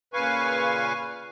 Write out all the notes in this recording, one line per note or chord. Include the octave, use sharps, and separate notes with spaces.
A#2 C#3 B4 F5 G#5 C#6